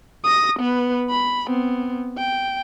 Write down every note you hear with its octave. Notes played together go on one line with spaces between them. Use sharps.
D#6 A#6
B3 B4
B5
B3 C4
G5